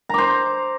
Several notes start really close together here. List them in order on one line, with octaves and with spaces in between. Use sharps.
A#5 D6 C5